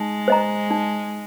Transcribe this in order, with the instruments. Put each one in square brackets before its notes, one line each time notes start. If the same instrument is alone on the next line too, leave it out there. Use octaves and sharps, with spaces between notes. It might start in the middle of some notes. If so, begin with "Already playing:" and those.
Already playing: [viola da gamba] G#3 [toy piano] D#4
[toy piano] C5 D#5 A#5
D#4